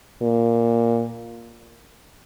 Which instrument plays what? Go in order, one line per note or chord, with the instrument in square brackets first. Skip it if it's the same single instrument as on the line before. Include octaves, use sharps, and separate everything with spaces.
[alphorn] A#2